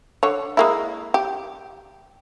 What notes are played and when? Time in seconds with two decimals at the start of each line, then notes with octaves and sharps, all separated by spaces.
0.23 D3 C#5
0.57 G#3 A#3 E4
1.14 G4